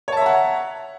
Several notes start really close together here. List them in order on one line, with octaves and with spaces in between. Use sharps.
C#5 A5 E5 A#5 F#5